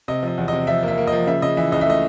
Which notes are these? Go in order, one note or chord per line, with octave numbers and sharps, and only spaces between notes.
C3 D#5
F3 D#5
E2
C3 D#5
F3 E5
A#3
E5
A#3
F3 D#5
C#3 E5
C#3 D#5
E3 E5
C#2 D#5
E5
A3 D#5